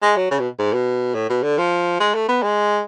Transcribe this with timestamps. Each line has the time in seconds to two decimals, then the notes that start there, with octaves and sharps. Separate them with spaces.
0.02 G#3
0.16 F#3
0.31 C#3
0.39 B2
0.59 G#2
0.73 B2
1.15 A2
1.29 B2
1.43 D3
1.58 F3
2.00 G#3
2.15 A3
2.28 B3
2.42 G#3